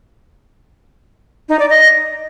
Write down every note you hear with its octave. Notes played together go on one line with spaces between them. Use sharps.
D#4
D5
D#5